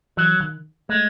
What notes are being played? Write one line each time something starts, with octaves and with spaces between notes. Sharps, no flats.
E3 F#3
D#3
G#3 A3